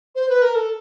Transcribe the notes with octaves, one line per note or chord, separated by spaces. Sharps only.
C5
B4
A#4
A4